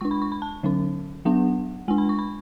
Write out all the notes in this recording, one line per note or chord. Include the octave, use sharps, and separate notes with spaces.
G#3 D4 C#6
B5
C#6
B5
A5
D3 F#3 C#4
F#3 B3 D4 F#5
G#3 D4 G#5
B5
C#6
B5